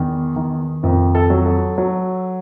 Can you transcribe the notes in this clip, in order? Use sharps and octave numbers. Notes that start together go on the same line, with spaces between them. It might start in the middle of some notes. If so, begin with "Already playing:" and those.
Already playing: E2 D#3
D#3
F2 A#4
A4
F#3
A4
F#3